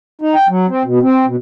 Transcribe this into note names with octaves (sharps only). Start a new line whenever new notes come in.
D#4
G5
F#3
C4
B2
C4
B2